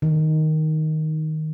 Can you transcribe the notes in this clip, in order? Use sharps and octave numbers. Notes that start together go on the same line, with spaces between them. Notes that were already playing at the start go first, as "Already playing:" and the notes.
D#3